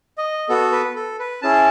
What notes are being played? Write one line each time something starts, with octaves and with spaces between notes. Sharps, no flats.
D#5
B3 F#4 A4
B4
A4
B4
C#4 E4 G#4 A5